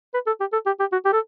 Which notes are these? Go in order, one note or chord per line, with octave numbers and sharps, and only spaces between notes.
B4
A4
G4
A4
G4
G4
F#4
G4
A4